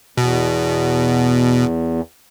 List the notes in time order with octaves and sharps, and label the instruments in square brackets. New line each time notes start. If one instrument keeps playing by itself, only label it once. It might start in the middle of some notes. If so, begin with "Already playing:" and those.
[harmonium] E2 [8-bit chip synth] B2